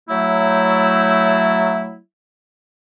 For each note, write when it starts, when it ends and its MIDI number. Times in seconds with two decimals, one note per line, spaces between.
0.09 1.97 54
0.09 1.97 57
0.09 1.97 64